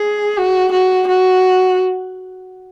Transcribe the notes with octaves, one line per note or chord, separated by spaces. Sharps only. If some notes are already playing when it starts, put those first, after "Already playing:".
Already playing: G#4
F#4
F#4
F#4